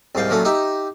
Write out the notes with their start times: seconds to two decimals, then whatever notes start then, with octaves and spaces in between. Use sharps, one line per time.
0.15 C2 G#2 F5 G5
0.30 A#2 F3 F#3 A3 C#4
0.45 D#4 G4 E5